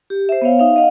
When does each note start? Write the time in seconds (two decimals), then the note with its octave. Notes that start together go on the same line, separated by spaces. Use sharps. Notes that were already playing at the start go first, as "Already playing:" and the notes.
0.10 G4
0.29 C5 E5
0.42 B3 C#5 F5
0.59 D#4 E5 F5
0.76 D#5 F5 F#5